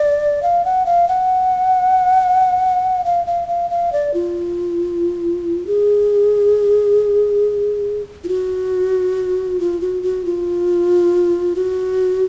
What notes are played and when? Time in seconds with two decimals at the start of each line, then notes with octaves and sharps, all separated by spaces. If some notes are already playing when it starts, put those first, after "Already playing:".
Already playing: D5
0.43 F5
0.65 F#5
0.86 F5
1.08 F#5
3.05 F5
3.27 F5
3.48 F5
3.70 F5
3.93 D5
4.14 F4
5.67 G#4
8.24 F4
8.29 F#4
9.60 F4
9.81 F#4
10.03 F#4
10.25 F4
11.56 F#4